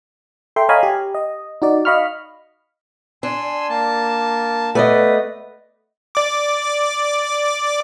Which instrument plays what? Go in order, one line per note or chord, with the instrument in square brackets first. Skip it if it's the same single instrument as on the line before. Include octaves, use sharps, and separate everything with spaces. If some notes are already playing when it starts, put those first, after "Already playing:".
[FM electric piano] A4 E5 G5 C6
C#5 D#5 F5 G#5 A#5 B5
G4
D#5
D#4 F#4 D5
D#5 F5 B5 C#6 F6
[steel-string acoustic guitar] D4 [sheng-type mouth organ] G#5 C6 E6
[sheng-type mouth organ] A#3 A5
[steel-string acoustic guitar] A3 D5 D#5 [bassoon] B3 [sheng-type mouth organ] B4
[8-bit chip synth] D5 D6